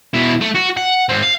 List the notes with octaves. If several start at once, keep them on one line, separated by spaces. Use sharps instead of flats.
B2 E4
A3
F#4
F#5
G#2 C4
F5